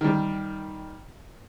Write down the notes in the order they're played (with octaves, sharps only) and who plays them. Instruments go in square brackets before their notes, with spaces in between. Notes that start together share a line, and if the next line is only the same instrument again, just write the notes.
[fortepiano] D#3 G3